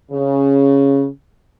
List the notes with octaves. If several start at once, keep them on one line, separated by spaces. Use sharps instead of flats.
C#3